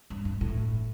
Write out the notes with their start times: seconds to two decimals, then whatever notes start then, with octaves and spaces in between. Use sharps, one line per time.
0.10 G2
0.25 G2
0.41 A2